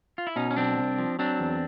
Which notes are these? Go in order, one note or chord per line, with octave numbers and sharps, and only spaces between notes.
F4
E4
B2 C#4 D#4
C#4
B1 C4 D4
C2
F3
F#3 C4 D4
E2